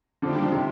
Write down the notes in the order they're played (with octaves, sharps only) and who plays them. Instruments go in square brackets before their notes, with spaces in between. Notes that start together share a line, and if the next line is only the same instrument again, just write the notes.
[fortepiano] D3 F3 [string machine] D#3 A#3 D4 G4
[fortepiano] G3
F3
C3 D#3